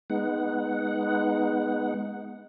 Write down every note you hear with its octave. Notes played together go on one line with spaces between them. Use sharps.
G#3 B3 D#4 F#5